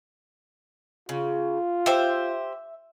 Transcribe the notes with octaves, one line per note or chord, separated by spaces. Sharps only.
C#3 F4
G4 C5 E5